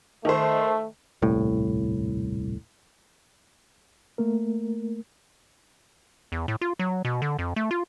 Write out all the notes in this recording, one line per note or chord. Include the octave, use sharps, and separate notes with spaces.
D#3 A3 C5
D#1 C2 A2
A3 A#3 A#4
E2
A2
F4
F#3
B2
D3
F2
A3
F4